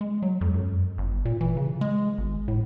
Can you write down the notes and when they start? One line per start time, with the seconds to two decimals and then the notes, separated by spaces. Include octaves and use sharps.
0.01 G#3
0.22 F#3
0.41 F2
0.54 F#2
0.98 G1
1.25 A#2
1.41 E3
1.57 C#3
1.81 G#3
2.18 G#1
2.48 A2